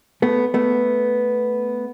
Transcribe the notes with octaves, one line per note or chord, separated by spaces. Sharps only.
A3 B3
A3 B3